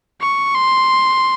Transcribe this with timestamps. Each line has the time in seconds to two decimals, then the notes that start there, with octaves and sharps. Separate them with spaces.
0.21 C#6
0.54 C6